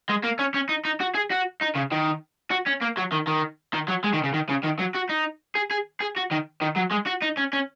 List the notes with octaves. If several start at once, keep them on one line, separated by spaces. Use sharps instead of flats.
G#3
A#3
C#4
C#4
D#4
D#4
F#4
G#4
F#4
D#4
C#3
D#3
F#4
C#4
A#3
F#3
D#3
D#3
D#3
F#3
G#3
D#3
C#3
D#3
C#3
D#3
F#3
F#4
D#4
G#4
G#4
G#4
F#4
D#3
D#3
F#3
G#3
F#4
D#4
C#4
C#4